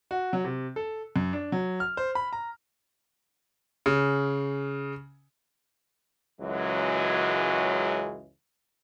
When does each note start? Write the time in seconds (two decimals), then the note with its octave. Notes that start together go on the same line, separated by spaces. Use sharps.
0.11 F#4
0.33 F#3
0.44 C3
0.76 A4
1.16 F#2
1.33 D4
1.52 F#3
1.80 F6
1.97 C5
2.15 B5
2.33 A#5
3.86 C#3
6.41 C#2 F#2 C#3 E3 F#3 G#3